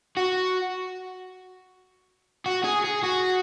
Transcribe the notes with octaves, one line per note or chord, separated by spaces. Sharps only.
F#4
F#4
G#4
G#4
F#4